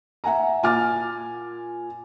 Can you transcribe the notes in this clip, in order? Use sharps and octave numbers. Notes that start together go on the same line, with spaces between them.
E5 F#5 G#5 A#5
A#2 G#5 D6 F6 A6